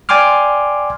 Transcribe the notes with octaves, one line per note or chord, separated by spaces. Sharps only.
D5 G5 G#5 C6 D6 F6